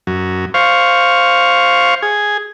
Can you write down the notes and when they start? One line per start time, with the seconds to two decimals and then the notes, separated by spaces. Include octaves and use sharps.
0.07 F#2
0.54 C5 F5 C#6
2.02 G#4